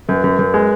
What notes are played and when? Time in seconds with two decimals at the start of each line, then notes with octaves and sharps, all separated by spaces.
0.08 F#2 B4
0.24 F#2
0.39 F#2
0.54 G#3